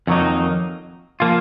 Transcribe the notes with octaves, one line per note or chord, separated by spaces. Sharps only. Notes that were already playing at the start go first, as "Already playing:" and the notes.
F2 D#3 F#3 A#3 D#4
F3 A#3 F4